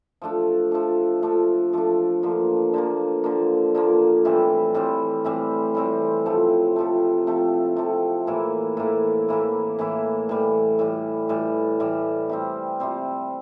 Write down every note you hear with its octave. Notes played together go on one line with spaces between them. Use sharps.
F3 A3 D4
F3 A3 D4
F3 A3 D4
F3 A3 D4
D3 F3 A#3
D3 F3 A#3
D3 F3 A#3
D3 F3 A#3
A2 E3 G3 C4
A2 E3 G3 C4
A2 E3 G3 C4
A2 E3 G3 C4
C3 F3 A3
C3 F3 A3
C3 F3 A3
C3 F3 A3
A2 E3 A#3 E4
A2 E3 A#3 E4
A2 E3 A#3 E4
A2 E3 A#3 E4
A2 E3 G3
A2 E3 G3
A2 E3 G3
A2 E3 G3
C3 G3 C4
C3 G3 C4